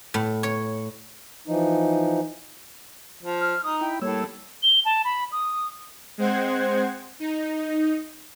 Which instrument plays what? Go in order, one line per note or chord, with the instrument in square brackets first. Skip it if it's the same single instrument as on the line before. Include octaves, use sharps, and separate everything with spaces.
[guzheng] A2
C#5
[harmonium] E3 F3 D#4
[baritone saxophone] F3
[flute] F6
[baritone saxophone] D#4 [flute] D#6
[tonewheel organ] E4 B5 [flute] G5
[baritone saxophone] A2 [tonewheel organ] G3 A#3 E6 [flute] C#5
[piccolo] G7
A5
B5
D#6
[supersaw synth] G#3 C4 C5 F#5 G#6
D#4